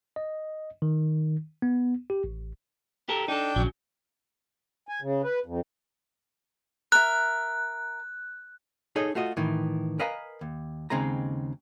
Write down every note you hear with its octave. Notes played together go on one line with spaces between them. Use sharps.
D#5
D#3
B3
G4
A1
G4 A4 A#4
D4 D#4 A4 G5
A#1 C#3 F#3
G#5
C#3
B4
F2
A#4 E5 F#6
D#4 G#4 A4 C#5 D#5
A3 F4 F#4 D#5
A2 D#3 E3
A#4 B4 D#5 F5 G#5 A#5
D#2
D#2 C#3 G#3 C4 D#4 A#5